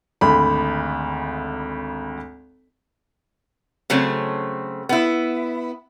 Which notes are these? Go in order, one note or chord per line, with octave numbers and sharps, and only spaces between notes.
G#1 D2 B5
C#3 F#3 A3 C4
B3 E4